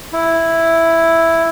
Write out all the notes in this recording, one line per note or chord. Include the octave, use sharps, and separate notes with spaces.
E4